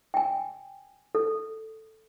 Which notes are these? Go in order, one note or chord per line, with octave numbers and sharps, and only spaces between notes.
G5 G#5
A4